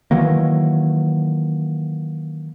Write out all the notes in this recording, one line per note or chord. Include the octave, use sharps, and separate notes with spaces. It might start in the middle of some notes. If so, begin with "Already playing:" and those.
D#3 E3 F#3 A#3